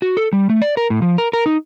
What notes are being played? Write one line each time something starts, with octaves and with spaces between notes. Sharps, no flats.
F#4
A4
G3
A3
D5
A#4
A2
F3
A#4
A#4
D#4